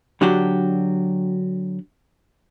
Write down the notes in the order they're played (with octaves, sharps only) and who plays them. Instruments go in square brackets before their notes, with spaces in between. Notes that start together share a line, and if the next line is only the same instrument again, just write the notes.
[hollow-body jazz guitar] D3 F#3 D4 F#4 G4